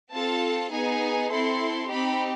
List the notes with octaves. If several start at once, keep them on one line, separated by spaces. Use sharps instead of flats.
C4 F4 A4 A5
B3 D#4 G#4 G#5
C4 E4 A4 C6
C4 D#4 G4 B5